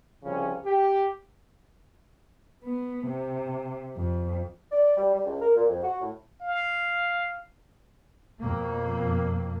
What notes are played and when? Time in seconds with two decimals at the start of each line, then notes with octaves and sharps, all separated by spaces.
0.24 C2 C#3 F3 C#4
0.65 G4
2.65 B3
3.07 C3
3.97 F2
4.72 D5
4.97 G3
5.15 G3
5.26 C#2
5.41 A#4
5.56 A#2
5.68 F2
5.83 F#4
6.01 A2
6.41 F5
8.40 F2 B2 A#3